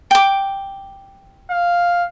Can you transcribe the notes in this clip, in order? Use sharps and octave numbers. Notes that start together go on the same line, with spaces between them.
G5 D6
F5